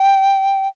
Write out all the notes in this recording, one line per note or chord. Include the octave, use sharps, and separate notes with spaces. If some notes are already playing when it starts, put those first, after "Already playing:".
Already playing: G5